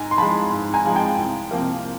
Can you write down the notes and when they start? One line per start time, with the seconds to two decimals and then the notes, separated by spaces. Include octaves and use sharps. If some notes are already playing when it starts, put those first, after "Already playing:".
Already playing: G#2 G#5 A#5
0.11 C6
0.18 F3 G#3 A5 B5
0.51 G#2
0.74 G#5 A#5
0.85 F3 G#3
0.96 G5 A5
1.18 C2
1.51 C3 F3 A#3